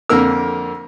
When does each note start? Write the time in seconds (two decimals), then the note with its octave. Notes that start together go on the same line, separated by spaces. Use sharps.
0.09 F2 D3 A#3 A#4 E6